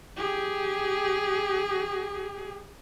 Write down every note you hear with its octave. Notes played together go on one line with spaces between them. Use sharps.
G4 G#4